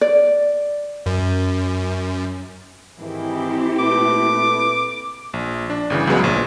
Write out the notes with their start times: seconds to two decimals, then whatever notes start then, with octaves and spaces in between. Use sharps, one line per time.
0.01 D5
1.06 F#2
2.99 G#2 D#3 E3 C4 E4 G4
3.79 A#2 A3 B4 D6
5.33 A#1
5.70 D4
5.90 G1 C#3 E3
6.07 C#2 C#3 F#3 G#3 B3
6.24 A#1